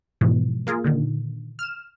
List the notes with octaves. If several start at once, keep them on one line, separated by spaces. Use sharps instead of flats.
G#2 B2 E3 F3
A#3 F4 G#4 A#4
A#2 D3 D#3
F6 E7